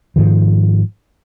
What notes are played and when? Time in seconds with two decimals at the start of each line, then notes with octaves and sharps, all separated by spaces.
0.16 G#2 D#3 F3